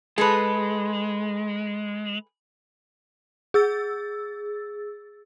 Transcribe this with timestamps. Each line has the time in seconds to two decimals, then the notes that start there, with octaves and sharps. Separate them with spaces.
0.18 G#3 G#4 A4 B4
3.54 G#4 E6 A6